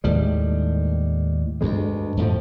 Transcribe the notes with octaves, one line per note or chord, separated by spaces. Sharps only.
D#2 A2 G3 G#3
D2 G2 G3 G#3
F2 A2 F3